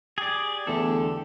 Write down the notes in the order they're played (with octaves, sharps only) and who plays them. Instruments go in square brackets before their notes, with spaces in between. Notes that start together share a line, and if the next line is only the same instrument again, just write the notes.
[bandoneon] G4 [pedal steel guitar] G#4 D5
[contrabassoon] E2 [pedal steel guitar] D3 A4 [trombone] A3